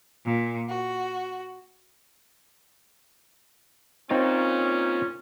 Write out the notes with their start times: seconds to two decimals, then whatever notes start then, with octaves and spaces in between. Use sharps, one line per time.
0.24 A#2
0.68 F#4
4.10 C4 C#4 D#4 F4 A#4 C#5